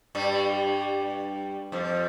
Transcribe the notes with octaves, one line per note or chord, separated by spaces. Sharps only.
G2 G3
F2 F3